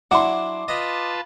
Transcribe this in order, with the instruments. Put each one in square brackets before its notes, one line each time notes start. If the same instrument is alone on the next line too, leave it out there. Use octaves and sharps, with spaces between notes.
[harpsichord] F#3 D4 E4 [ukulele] F#5 [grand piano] C6 D6
[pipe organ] F4 B4 A5 [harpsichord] D#5